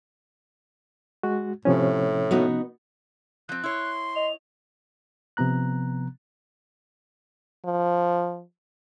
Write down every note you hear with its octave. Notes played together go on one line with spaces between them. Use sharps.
G#3 F#4
A2 C3 F3 C#4
B3 D#4 F#4
F3 C4 F#6
E4 C#5 C6
D#5 F7
C3 F3 B3 A#5 F#6
F3